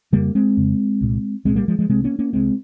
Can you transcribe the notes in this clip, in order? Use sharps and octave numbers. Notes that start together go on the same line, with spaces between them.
F2 C#3 G3 A#3
G#3 C4
F2 C#3
C2 A#2
C2 A#2 G#3 C4
G3 A#3
F3 G#3
F3 G#3
C2 C3 G#3 C4
A#3 C#4
A#3 C#4
C2 C3 G#3 C4